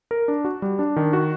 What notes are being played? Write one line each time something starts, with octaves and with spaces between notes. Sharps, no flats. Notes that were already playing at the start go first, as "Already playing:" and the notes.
A#4
D4
F#4
G3
D4
D#3
F#4